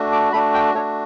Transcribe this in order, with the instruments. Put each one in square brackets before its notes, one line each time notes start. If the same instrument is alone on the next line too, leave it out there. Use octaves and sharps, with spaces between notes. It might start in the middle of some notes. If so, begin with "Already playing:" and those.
Already playing: [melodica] A3 D4 F#4
D6
A3 D4 F#4 B5
G5
A3 D4 F#4 C#5